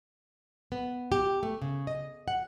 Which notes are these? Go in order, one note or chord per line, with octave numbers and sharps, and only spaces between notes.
B3
G4
A3
C#3
D#5
F#5